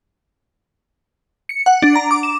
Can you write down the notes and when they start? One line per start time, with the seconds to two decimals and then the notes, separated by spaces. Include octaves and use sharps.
1.49 C#7
1.66 F#5
1.82 D4
1.96 A#5
2.11 D6
2.23 E7